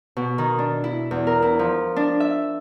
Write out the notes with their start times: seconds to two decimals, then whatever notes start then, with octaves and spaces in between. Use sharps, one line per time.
0.17 B2
0.38 D#3
0.59 D4
0.84 E4
1.11 E2
1.27 A#4
1.42 E4
1.59 F3
1.96 D4
2.20 E5